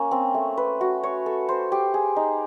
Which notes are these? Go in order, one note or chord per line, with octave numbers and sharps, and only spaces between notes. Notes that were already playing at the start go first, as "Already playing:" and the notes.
Already playing: A#3 C#4
C4
A3
B4
F#4
C#5
A4
C5
G4
G#4
D#4